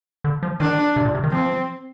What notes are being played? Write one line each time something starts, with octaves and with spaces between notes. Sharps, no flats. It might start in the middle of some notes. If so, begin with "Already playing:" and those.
D3
F3
D#3 D4
C3
A#2
C3
D#3
F3 C4